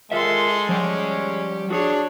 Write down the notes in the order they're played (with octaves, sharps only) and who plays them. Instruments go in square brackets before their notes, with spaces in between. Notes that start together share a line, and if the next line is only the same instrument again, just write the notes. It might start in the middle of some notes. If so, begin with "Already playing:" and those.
[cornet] G#3 [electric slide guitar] F4 A#4 E5 [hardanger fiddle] A4 C6
[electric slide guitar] F3 G3 [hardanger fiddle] C#4 G4
[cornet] D4 [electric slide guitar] F#4 G#4 [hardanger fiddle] C#5